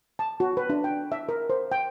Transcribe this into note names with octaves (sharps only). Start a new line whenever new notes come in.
A5
F#4
B4
D4
G5
E5
A#4
C5
G5